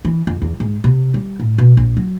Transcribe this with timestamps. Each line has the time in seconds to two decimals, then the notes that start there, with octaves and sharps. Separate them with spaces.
0.05 E3
0.27 F2
0.42 E2
0.60 G#2
0.84 C3
1.14 G3
1.40 A2
1.58 B2
1.77 A#1
1.97 F#3